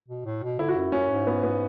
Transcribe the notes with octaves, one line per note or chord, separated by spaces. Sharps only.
B2
A2
B2
D3 E4
F#4
F#2 E4
F#2 C#4
G#2
B3
B3